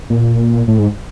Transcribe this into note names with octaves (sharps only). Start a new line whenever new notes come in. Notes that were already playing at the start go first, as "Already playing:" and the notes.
A#2
A2
G#2